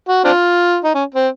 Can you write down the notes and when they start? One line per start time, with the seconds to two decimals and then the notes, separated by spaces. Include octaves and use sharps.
0.09 F#4
0.24 C4 D4 F4
0.84 D#4
0.94 C#4
1.14 C4